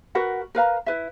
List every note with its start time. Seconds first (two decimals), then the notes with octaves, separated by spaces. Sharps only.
0.15 F#4 A#4 B4 F#5
0.55 A#4 B4 F5 A#5
0.86 E4 B4 E5